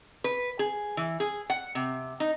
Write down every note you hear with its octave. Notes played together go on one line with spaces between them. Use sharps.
B4
G#4
E3
G#4
F#5
C3
D#4